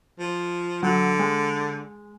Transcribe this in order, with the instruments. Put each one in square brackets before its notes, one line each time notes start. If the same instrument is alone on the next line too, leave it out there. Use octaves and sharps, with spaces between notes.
[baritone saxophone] F3
[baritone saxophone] D3 [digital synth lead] F#3
[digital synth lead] G#3